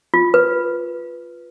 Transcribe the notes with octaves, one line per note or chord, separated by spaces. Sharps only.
F4
B4